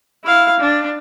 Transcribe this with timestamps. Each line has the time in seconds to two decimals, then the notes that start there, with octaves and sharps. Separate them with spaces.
0.25 E4 F5
0.60 D4